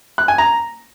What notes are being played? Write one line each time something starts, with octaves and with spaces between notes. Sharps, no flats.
F#6
G#5
A#5